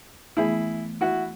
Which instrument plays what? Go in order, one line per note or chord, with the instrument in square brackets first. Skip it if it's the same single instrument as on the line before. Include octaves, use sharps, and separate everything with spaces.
[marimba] E3 A3 B3 [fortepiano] E4 G#4
[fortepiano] E4 F#4